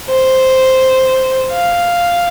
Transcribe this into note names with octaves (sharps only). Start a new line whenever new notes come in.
C5
F5